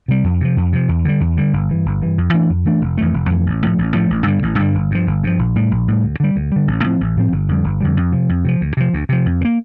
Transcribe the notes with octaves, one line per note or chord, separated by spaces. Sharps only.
C3 G3
F2
C3 F3
F2
C3 F3
E2
D3 G3
E2
D3 G3
G1
G2 E3
G1
G2 E3
F2
E3 A3 D4
F2
E3 A3 D4
F1
F2 E3 A3
F1
F2 E3 A3
A1
A2 F3 A3
A1
A2 F3 A3
A1
G2 D3 G3
A1
G2 D3 G3
G1
G2 F3
G1
G2 F3
A#1
A2 G3
A#1
A2 G3
D2
D3 G3
D2
D3 G3
A1
A2 F3 C4
A1
A2 F3 C4
G1
F2 D3 G3
G1
F2 D3 G3
F2
C3 F3
F2
C3 F3
D2
C3 F3
D2
C3 F3
F2
E3
A#3